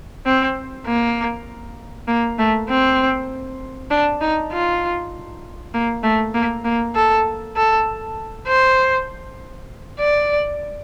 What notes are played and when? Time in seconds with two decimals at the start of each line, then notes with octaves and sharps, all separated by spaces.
0.26 C4
0.87 A#3
2.08 A#3
2.39 A3
2.69 C4
3.91 D4
4.21 D#4
4.52 F4
5.74 A#3
6.04 A3
6.34 A#3
6.65 A#3
6.95 A4
7.57 A4
8.47 C5
9.99 D5